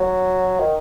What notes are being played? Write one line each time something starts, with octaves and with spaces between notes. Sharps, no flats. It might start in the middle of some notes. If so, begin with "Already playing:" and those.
Already playing: F#3
D#3